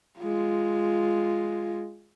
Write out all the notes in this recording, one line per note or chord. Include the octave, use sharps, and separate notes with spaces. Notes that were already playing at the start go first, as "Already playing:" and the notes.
G#3 F4